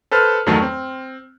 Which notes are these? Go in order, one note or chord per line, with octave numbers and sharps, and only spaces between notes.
A4 B4 C5 A5 F6
E2 G2 D#3 F#3 A3 A5
C4